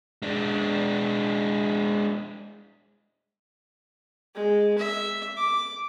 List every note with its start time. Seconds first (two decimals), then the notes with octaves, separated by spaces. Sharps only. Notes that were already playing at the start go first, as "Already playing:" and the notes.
0.22 G#3 D4
4.35 G#3
4.78 E5
5.37 D6